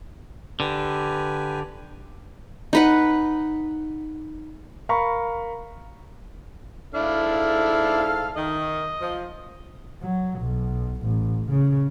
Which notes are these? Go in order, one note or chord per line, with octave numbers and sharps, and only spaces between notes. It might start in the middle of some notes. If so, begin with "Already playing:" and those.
D3 G4 B4 G#5
D#4 B4 F#5
A#4 F5 A#5 B5 C#6
G#2 D4 E4 A4 F5
D#3 D#5
F3
F#3
B1
A1
C#3